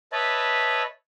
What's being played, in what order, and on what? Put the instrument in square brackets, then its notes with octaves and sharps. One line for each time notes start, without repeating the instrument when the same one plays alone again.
[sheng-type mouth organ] B4 C#5 D#5 E5 A5 B5